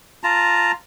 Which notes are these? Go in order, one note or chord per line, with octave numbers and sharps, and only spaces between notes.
F4 A5 A#5